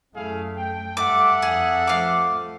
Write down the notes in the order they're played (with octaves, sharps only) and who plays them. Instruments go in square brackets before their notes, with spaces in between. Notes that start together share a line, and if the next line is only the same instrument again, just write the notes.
[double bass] F#2 A3 [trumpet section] E4 G#4 F5
[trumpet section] G5
[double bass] G2 [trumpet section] A4 E5 F#5 [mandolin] D6
[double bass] F2 [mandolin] G#4
[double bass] F3 A3 [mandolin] F5 D6